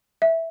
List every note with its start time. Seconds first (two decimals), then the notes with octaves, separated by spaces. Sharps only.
0.22 E5